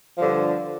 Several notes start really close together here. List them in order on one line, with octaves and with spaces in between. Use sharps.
F3 G2 D3